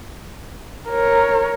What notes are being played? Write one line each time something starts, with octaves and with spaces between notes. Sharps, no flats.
A#4 C#5